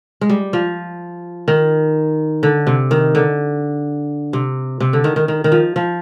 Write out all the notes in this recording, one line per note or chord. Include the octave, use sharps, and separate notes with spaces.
G#3
G3
F3
D#3
D3
C3
D#3
D3
C3
C3
D3
D#3
D#3
D#3
D#3
F3
F3